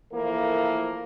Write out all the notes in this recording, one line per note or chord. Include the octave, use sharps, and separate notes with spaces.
E3 F3 A3 A#3 A#4